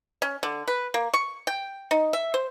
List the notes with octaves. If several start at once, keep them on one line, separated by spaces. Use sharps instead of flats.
C#4
D3
B4
A#3
C#6
G5
D#4
E5
C5